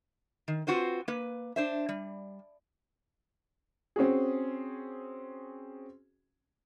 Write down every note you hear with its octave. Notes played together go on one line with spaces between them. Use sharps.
D#3
C4 F4 F#4 B4 C5
A#3 B4
D4 C5 E5
G3
C4 C#4 F#4 G#4